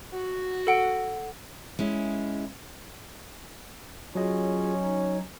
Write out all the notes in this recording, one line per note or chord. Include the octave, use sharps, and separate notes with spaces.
F#4
A4 F#5 D7
G#3 C#4 E4
F#3 C#4 F4 G#4 C#5 D#5
D#4 C#5